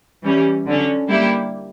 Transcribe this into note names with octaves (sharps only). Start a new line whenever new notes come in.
E3 G3 C#4
D3 F#3 C#4
G3 A#3 E4 G4